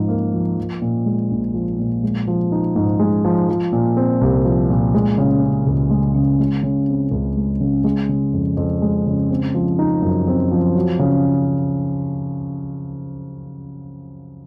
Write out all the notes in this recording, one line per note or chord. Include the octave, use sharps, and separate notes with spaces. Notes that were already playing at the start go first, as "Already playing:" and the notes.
Already playing: G#2 F3 D#4
A#3
F3
F3
A#2
G#3
A#1
F3
A#2
G#3
F3
D#4
G#2
G#3
F3
F3
A#2
C4
C2
F3
A#2
G#3
C#3
C#4
C#2
G#3
C#3
G#3
C#3
C4
C#2
G#3
C#3
G#3
C#3
F2
F2
G#3
C#3
C4
F3
D#4
F#2
C4
F3
F#3
C#3